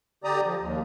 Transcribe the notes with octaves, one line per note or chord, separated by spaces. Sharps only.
D3 G4 D5 A#5 D#6
F3
D#2